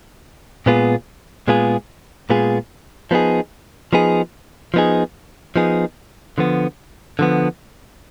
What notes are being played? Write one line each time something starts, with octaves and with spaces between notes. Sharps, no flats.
A#2 G#3 B3 F4 G#4
A#2 G#3 B3 F4 G#4
A#2 G#3 B3 F4 G#4
F3 B3 D#4 G#4
F3 B3 D#4 G#4
F3 B3 D#4 G#4
F3 B3 D#4 G#4
D3 F3 B3
D3 F3 B3